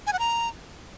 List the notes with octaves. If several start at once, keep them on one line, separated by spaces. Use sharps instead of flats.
G#5
F#5
A#5